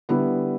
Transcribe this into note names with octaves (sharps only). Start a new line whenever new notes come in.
D3 G3 B3 E4 B4